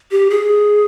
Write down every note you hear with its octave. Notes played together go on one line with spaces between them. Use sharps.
G4
G#4